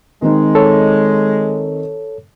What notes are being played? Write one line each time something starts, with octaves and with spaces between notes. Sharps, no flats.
D#3 G#3 C4 D#4
A4 C#5